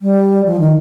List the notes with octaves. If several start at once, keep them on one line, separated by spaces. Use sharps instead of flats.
G3
F3
D#3